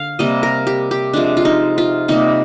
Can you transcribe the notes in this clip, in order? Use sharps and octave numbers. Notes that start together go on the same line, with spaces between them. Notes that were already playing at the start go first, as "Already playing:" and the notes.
Already playing: D3 F5
C3 G3 A#3 D#5
A#4
G4
G4
C3 F3 G#3 D4
F4
D#4
F4
C3 G3 A#3 D#4